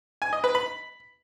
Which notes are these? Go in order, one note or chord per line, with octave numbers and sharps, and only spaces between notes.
G#5
D#5
B4
B5